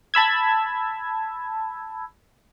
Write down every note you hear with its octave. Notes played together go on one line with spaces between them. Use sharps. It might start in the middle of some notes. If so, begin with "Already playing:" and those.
A5 B5 E6 G#6